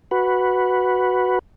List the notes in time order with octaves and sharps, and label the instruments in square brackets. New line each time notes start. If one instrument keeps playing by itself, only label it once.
[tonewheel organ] F#4 B4